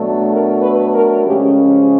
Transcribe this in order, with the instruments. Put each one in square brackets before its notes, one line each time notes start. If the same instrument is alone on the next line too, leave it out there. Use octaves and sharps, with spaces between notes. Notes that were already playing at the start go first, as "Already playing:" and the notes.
Already playing: [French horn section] B2 F#3 A3 D4
A#4
B4
A#4
C#3 F3 G#3 C#4 G4